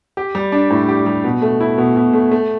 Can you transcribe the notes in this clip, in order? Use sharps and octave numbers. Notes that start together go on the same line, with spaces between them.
G4
G3
D4
A2
G4
G3
B2
A3
E4
B2
B2
A3
A3